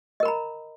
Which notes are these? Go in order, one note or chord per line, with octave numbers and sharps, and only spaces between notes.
A#4 D#5 A#5 B5